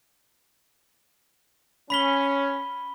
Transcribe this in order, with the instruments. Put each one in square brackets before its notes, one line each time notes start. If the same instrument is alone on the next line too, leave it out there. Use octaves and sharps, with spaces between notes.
[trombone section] C#4 [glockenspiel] B5 B6 G7